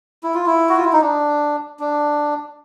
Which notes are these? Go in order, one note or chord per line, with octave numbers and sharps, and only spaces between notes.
E4
F4
E4
F#4
F4
E4
D#4
D4
D4